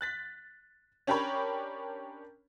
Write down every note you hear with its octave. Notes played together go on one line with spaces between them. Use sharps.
F#6 A6 B6
C#4 D4 G4 A#4 C#5 B5